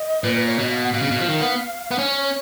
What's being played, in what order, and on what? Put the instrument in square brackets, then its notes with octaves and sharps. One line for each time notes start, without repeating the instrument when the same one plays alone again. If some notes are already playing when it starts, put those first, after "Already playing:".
Already playing: [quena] D#5
[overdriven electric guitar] A#2 [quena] B4
[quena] B4
C#5
[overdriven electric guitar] B2 [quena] D#5
[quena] F5
F#5
[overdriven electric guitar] B2 [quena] F5
[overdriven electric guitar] C#3
B2
F3
D#3
B3
B3
[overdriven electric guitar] C#4 [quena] C#5
[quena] C#5
C#5